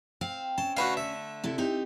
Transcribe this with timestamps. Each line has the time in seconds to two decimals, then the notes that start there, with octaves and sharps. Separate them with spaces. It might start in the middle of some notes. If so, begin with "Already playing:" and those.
0.21 C4 F5
0.58 C#4 A5
0.77 D3 A3 F#4 B4 F5
0.97 E5
1.44 C3 E4 A4
1.58 C4 D#4 G4